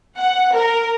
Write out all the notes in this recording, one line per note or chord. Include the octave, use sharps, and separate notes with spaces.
F#5
A#4